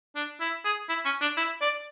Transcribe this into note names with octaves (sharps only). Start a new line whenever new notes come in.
D4
E4
G#4
E4
C#4
D4
E4
D5